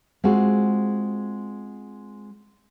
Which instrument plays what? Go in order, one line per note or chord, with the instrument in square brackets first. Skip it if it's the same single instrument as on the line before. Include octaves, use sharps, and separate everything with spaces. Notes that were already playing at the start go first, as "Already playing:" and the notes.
[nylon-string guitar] G#3 C4 F4 F#4